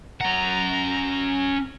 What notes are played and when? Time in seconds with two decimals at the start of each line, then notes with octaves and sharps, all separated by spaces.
0.21 C#4 F#5 A#5